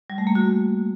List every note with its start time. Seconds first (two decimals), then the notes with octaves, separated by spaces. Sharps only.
0.10 G3
0.18 A3
0.27 A#3
0.35 F#4